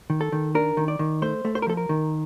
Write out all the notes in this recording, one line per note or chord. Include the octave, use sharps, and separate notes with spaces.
D#3
A4
D#3
D4 A#4
D#3
D5
D#3
A3 C5
A3
C5
A#4
F3 A4
A#4
D#3